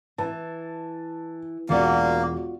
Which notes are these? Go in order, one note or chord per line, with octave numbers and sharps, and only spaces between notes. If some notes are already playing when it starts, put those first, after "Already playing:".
E3 A5
E1 A#3 F4 F#4 D5